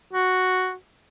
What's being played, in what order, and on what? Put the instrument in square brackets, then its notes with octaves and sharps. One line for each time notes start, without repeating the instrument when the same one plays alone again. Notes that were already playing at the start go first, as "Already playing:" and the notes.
[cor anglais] F#4